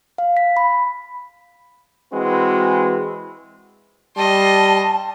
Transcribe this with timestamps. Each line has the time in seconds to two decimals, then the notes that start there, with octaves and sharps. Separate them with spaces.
0.18 F5
0.37 B6
0.57 B5
2.13 E3 G#3 C4 F#4 B4
4.17 G3 D#5 A5 C6